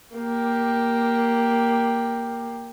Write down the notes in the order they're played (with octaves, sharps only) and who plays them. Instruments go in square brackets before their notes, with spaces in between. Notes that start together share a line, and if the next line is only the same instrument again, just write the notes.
[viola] A#3 G4